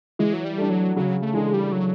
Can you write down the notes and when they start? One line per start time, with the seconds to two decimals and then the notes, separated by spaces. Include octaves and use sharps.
0.19 E3 G#3
0.33 F#3
0.45 G3
0.58 A3 D4
0.70 F#3
0.96 C#3 F#3
1.22 A3
1.34 E3 G#3 A3 D4
1.54 G3
1.72 F#3